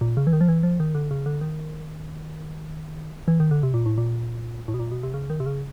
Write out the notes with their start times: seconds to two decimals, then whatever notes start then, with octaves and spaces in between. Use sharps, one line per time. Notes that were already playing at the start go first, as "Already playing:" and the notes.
0.01 A#2
0.17 C#3
0.27 E3
0.33 D#3
0.41 F3
0.48 E3
0.63 F3
0.80 D#3
0.95 D3
1.11 C#3
1.26 D3
1.41 D#3
3.28 E3
3.40 D#3
3.51 D3
3.63 C3
3.74 A#2
3.86 A2
3.98 A#2
4.68 A2
4.74 B2
4.80 A#2
4.92 B2
5.03 C3
5.14 C#3
5.30 D#3
5.40 C3
5.46 C#3